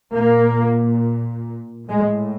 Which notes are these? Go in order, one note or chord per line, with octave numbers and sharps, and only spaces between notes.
A#2 A#3
A2 G#3